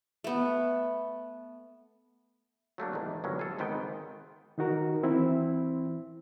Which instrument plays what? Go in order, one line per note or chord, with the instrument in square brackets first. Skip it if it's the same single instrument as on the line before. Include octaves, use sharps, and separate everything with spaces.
[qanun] A3 B3
[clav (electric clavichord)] F#3 A3 A#3 D4
E2 G#2 D#3
G1 G2 C#3 F#3 G#3 C#4
G#4 A4
G#1 G#2 D#3 B3 G5
[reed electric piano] D#3 D#4 F#4 A#4
E3 C4 E4